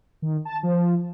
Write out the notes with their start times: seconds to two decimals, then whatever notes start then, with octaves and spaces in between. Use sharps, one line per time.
0.22 D#3
0.45 A5
0.63 F3